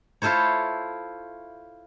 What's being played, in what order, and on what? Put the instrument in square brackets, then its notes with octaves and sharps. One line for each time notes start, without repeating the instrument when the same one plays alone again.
[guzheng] E4 F4 A4 C5 C#5